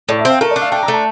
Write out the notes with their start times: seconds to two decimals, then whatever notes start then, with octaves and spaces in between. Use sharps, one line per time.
0.09 A2 D5
0.19 E5
0.25 C4 F5
0.41 A3 A#4
0.51 D4 D5
0.62 F5
0.72 D4 G5
0.83 A#5
0.88 A3
0.94 A5